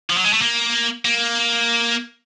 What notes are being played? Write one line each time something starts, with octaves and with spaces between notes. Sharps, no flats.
F3
F#3
G#3
A3
A#3
A#3